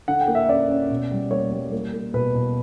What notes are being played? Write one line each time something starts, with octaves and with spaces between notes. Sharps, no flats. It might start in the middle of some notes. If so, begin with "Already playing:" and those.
D3 F#5
G5
A#3
E5
C#4 D5
C#4
B2
G3
A#3 C#5
G3
A#3
A#3
B2 B4
B2